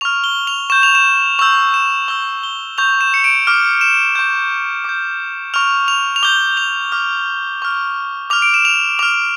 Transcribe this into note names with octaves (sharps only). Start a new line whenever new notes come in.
C#6 F6 F7
G7
F7
C#6 G6 E7
F7
E7
C#6 E6 G6 F7
E7
C#6 E6 G6 G7
G7
C#6 G6 F7
E7
C#7
D7
D6 F6
E7
C#6 G6
D6 G6
C#6 F6 F7
F7
F7
D6 G6 G7
F7
D6 F6
C#6 F6
D6 F6 F7
D7
E7
F7
D6 F6 F7